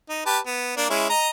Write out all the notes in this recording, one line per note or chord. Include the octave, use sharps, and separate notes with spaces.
D#4
G4 B4 A5
B3
A#3 D4
G#3 C#4 E4
D#5 A#5